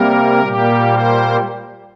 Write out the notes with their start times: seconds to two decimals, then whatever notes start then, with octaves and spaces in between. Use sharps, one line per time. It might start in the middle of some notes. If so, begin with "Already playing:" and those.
Already playing: C3 G3 A#3 A#4
0.44 A#2 G3 A#3 G4
0.92 C5